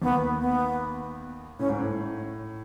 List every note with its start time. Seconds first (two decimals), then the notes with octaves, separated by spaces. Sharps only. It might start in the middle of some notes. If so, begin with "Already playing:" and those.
0.02 D#2 D#3 B3
0.41 B3
1.59 A2 C#4
1.69 G#2
1.78 A2